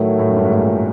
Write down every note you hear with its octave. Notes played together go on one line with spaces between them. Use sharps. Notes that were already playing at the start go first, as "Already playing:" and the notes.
Already playing: A2 D#3 F#3 A3
A2
F#2
G2
G#2
A2
A#2